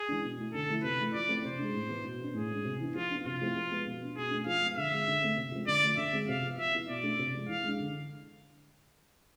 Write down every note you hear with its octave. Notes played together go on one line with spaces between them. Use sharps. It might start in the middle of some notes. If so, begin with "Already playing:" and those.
Already playing: G#4
E3 G#3 D4
B2
A3 E4
D3 A4
F3 A3 E4
C3 B4
E3 A3
F3 D5
A3 C4 E4
C3 C5
G#3 D4
A2
E3 B3 E4
B2
B3 D4
A2 G#4
G#3 D4
C3
E3 B3 D4
F3 F4
B3 D4
C3 F4
F3 A3 C4 E4
F3
G#3 B3
B2
B3 D4
B2 G#4
A3 D4
F3 F5
G#3 B3
D3 E5
G#3 C4
D3
A3 C4
C3
F3 G#3 C4
D3 D5
F3 A3
D3 E5
G#3 C4
C3 F5
F3 B3
F3 E5
B3 E4
B2 D5
A3 D4
C3
F3 G#3
E3 F5
G#3 D4
D3